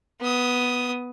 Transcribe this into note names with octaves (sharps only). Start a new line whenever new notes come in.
B3 D#6